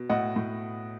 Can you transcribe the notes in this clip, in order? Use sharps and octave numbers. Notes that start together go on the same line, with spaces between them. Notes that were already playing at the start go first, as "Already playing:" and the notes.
Already playing: B2
A2 D#5 F#5
A2